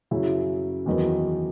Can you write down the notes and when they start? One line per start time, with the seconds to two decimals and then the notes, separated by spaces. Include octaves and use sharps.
0.11 F#2 C#3 F#3 C#4 E4
0.86 E2 D#3 F#3 B3 D#4